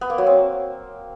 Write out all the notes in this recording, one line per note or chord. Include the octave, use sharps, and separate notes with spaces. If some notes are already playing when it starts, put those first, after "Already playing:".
B3
A#3
F#3
C4